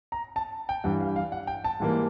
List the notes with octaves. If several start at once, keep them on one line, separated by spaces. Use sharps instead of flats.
A#5
A5
G5
G2 E3 G3 F#5
F5
F5
F#5
G5
A5
G#2 E3 G3 A#3